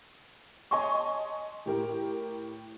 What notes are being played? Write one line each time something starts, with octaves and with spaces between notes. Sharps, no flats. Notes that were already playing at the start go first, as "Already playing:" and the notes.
C#5 D#5 G#5 A5 C6 C#6
A2 G4 A#4